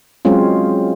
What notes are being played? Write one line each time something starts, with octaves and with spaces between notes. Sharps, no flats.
F#3 G#3 C4 C#4 F4